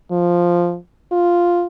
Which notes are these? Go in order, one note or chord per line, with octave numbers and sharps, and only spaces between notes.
F3
F4